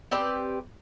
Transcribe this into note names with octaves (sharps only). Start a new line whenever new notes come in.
C4 G4 B4 D5